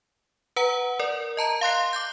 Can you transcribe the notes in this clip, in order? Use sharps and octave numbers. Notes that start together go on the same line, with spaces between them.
B4 F#5 A#5
A#4 D5
D#5 A5 A#5
F5 C6 F#6 C7
D6 G6